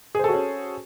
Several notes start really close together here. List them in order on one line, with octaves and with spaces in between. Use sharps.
G#4 C5 A4 F#4 C#4